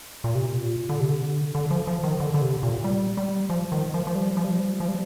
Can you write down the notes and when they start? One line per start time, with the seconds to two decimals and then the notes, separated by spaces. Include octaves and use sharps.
0.24 A#2
0.35 C3
0.46 A#2
0.89 D3
1.00 C3
1.11 D3
1.55 D3
1.71 F3
1.87 F3
2.03 D#3
2.20 D3
2.34 D3
2.41 C3
2.63 A#2
2.84 G3
3.17 G3
3.50 F3
3.72 D#3
3.94 F3
4.07 F3
4.15 G3
4.37 F3
4.44 G3
4.50 F3
4.59 G3
4.80 F3
4.88 G3